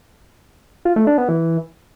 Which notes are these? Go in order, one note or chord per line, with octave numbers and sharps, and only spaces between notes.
F4
A3
D4
B3
E3